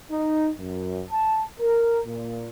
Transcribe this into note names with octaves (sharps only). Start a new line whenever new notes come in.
D#4
F#2
A5
A#4
A#2